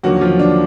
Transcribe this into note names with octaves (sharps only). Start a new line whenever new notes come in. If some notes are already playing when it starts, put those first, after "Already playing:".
D#2 D3 F3 F#3 A#3 F#4
F3 F4
D4